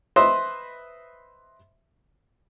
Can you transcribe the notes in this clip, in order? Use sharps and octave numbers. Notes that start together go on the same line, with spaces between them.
B4 C5 D#5 E5